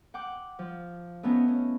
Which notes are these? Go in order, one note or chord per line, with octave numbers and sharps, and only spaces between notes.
F#5 G5 D6
F3
A3 B3 C#4 D#4
C#4